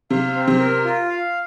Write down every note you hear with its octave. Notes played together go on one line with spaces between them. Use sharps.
C3 F5
C4
C3
A#4
F4
F5